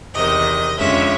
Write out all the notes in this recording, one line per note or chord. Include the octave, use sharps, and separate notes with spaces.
E2 C3 D#3 D#5
F2 D3 F3 G#3 C#4 E5